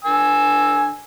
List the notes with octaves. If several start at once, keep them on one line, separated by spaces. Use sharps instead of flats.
D3 G#5 E6